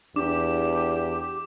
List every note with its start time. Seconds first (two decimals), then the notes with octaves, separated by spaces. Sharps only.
0.16 E2 D4 G4 D6